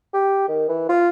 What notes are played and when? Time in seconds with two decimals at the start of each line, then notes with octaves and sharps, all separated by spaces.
0.13 G4
0.48 D#3
0.69 E3
0.89 F4